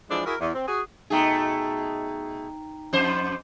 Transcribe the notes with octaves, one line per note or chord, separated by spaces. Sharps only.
E3 F3 G#3 D4 D5
E4 F#4 G#4 A#4
E2
C4
F#4 G#4
B2 A3 D#4 G#4 G5 A#5
F2 C5